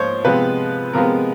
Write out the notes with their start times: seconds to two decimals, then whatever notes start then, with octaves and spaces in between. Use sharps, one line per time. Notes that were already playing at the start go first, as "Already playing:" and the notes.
Already playing: G#2 F3 A#3 C5 C#5
0.25 C3 F3 G#3 B3 B4
0.93 C3 F3 G#3 B3 A#4